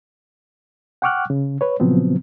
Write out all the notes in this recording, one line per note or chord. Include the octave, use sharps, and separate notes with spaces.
F#5 G5 C#6 D6 F6 F#6
C#3
B4 C#5
A#2 C#3 F3 F#3 B3 C4